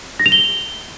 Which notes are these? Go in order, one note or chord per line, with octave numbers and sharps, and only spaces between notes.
A#6
F7
G7